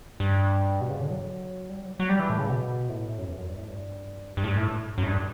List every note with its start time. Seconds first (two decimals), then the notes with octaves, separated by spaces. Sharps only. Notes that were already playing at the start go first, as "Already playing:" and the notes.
0.20 G2
0.81 B2
0.90 C#3
1.01 D3
1.11 F#3
1.69 G3
1.85 F#3
2.00 F#3
2.09 G3
2.20 E3
2.30 A2
2.39 C#3
2.49 B2
2.89 A2
3.18 F#2
3.28 E2
3.38 F#2
3.48 G2
3.58 A2
3.68 G2
4.37 G2
4.44 A2
4.47 G2
4.57 A2
4.98 F#2
5.03 A2
5.07 G2